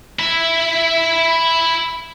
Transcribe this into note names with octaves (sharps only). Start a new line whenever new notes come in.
E4 E5